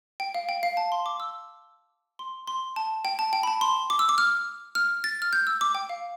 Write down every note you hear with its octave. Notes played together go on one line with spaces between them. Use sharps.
G5
F5
G5
F5
A5
C6
D6
E6
C6
C6
A5
G5
A5
G5
B5
A5
C6
D6
E6
D6
F6
F6
A6
F6
G6
E6
D6
G5
F5